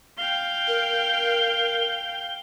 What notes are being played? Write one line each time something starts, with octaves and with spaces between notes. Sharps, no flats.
F5 G5 G7
A#4